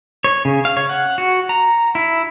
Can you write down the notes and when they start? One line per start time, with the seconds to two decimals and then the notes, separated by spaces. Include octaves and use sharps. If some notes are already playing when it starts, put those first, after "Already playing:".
0.24 C#5
0.45 C#3
0.65 F5
0.77 C#5
0.89 F#5
1.18 F#4
1.49 A#5
1.95 E4